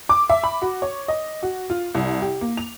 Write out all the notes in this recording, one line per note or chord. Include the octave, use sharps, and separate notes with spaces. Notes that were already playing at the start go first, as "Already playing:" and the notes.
D6
E5
B5
F#4
C#5
D#5
F#4
F4
C2
G4
A#3
F7